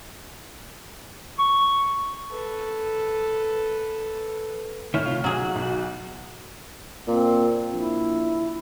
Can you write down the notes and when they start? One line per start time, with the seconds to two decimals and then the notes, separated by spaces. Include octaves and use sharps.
1.39 C#6
2.31 A4 B4
4.94 A2 D#3 E4 C#5 F6
5.06 C3 F4
5.24 B1 F#3 F#4 G#4
5.55 B1
7.07 A#2 C4
7.74 A#1 E4